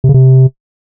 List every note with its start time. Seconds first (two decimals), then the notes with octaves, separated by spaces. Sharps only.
0.04 C3
0.09 C#3
0.14 C3